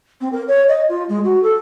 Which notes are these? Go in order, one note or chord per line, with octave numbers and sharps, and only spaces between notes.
C4
A#4
C#5
D#5
F4
G#3
F#4
A4